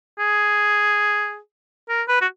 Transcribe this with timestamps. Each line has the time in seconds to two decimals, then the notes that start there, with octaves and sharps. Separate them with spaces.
0.19 G#4
1.89 A#4
2.08 B4
2.21 F#4